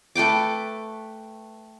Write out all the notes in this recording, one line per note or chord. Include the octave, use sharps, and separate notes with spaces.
A3 B4 G5 D6